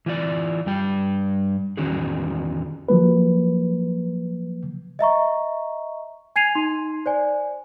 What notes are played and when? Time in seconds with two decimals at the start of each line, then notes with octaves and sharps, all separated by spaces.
0.06 E3 F4 D5
0.66 G2 G3 G5
1.77 E2 D#3 C#4 F#4 G#4
2.89 F3 F#3 A#3 B4
4.99 D#5 E5 A#5 C#6
6.36 G#5 G#6 C7 D#7 F7
6.55 D#4 C6
7.06 C5 D5 G#5